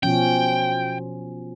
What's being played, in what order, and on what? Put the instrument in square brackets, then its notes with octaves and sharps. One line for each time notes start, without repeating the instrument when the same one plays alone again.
[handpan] B2 F3 C#4 [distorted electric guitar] G5